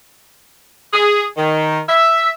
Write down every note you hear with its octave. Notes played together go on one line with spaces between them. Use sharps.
G#4
D#3
E5